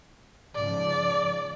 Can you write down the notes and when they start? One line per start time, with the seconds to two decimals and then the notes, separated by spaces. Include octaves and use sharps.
0.55 G#2 C#3 F3 D5